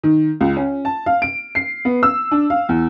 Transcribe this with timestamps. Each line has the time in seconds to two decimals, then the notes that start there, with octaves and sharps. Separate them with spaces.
0.03 D#3
0.41 C#2
0.57 C#4
0.85 A5
1.06 F5
1.22 D7
1.55 C7
1.85 B3
2.03 E6
2.31 D4
2.50 F5
2.69 E2